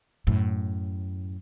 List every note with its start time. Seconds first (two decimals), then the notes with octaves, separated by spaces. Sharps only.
0.27 F#2 A2